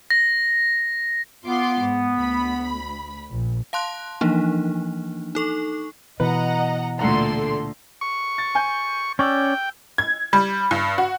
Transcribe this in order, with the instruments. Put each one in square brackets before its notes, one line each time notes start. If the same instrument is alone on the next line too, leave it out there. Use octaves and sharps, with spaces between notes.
[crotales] A#6
[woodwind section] B3 [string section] F4 C6 D6
[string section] G#2
D2 B5
A#1
[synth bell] F5 A5 C6 F#6
E3 F3 A#3 D4 D#4
D#4 A4 C#6
[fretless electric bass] B2 E3 [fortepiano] B4 [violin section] D#5 F#5 A#5
[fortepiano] D2 F#5 A#5 [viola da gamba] A#2 D3 A3 [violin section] A4 C6
[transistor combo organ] C#6
[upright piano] A6
G#5 G6
[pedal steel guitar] C#4 D5 [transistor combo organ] G5 [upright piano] C#6 E6
[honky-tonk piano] G#6
G3
G2
F#4